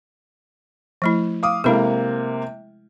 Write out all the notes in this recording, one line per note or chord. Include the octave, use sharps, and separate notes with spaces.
F3 A3 E4
F5 D6 D#6
C3 G#3 A#3 E4 A4